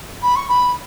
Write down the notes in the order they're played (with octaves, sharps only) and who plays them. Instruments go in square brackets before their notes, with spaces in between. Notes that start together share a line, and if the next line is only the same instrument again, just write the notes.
[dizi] B5
C#6
B5